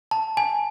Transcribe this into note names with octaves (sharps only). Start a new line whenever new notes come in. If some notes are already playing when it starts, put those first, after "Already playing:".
A5
G#5